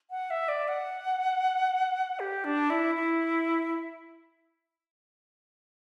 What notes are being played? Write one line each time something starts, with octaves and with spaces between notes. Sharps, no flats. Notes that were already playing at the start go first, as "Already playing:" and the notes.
F#5
E5
D5
F#5
G4
D4
E4
E4